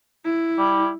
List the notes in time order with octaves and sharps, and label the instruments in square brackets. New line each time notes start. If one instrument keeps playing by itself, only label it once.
[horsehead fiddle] E4
[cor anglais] G3